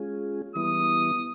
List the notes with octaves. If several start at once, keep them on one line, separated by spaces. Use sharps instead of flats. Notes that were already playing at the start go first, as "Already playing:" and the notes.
Already playing: G#3 C#4 F4 G#4
E3 G3 B3 E4 D#6